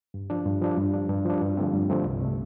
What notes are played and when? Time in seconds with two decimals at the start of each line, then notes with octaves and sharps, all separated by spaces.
0.14 G2
0.30 F3 D4
0.45 G2
0.62 F3 D4
0.77 G2
0.93 F3 D4
1.09 G2
1.25 F3 D4
1.41 G2
1.57 D3 F3 A3 C4
1.73 G2
1.90 D3 F3 A3 C4
2.05 C2
2.21 C3 A3